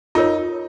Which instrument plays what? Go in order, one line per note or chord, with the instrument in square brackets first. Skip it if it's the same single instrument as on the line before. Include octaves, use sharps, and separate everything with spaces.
[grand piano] D#4 [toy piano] F4 A#4 C#5